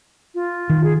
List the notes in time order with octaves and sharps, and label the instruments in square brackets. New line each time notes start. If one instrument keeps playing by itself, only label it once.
[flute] F4
[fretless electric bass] D#3
[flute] G#4